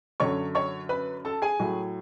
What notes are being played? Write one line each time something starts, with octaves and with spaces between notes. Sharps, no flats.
F#2 D3 F#3 C#5 C#6
C#5 C#6
B4 B5
A4 A5
G#4 G#5
A2 F#3